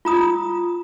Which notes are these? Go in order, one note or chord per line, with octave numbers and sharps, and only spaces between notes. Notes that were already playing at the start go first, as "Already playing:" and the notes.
F4 A#5 D#6